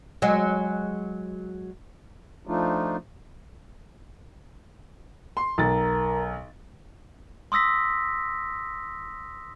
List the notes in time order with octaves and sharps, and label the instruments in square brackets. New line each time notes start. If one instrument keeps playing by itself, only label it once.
[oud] F#3 G#3
[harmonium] F3 A3 D4 D#4 F4
[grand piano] C6
[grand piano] B1 A6 [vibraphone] A#4 A#5
[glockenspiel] C6 D#6 E6 A#6 B6